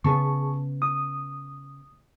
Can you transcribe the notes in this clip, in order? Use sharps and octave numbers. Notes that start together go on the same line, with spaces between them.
C#3 B3 G#4 A5 C#6
D#6